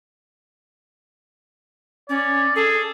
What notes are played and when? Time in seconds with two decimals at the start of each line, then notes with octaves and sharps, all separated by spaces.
2.09 C#4 D5
2.56 G#4 A4